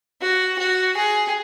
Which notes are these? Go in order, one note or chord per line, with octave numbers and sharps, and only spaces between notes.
F#4
F#4
G#4